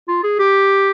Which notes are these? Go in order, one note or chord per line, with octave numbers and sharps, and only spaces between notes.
F4
G#4
G4